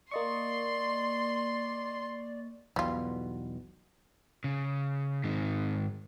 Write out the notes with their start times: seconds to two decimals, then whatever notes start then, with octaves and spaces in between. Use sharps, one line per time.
0.11 A#3 D5 D#5 C6 C#6
2.76 B1 E2 B2 G3 F4
4.44 C#3
5.24 G#2 D#3